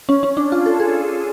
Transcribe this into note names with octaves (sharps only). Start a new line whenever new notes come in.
C#4
C#4
D4
F4
A4
G#4